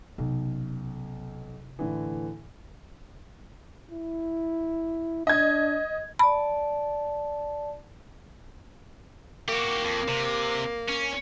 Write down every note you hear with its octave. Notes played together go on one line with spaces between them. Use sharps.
B1 C3 C#4
A2 D3 E3
E4
D4 D#5 G#6
D5 A5 B5
A#3 F#4 G4
F2
C3
C#4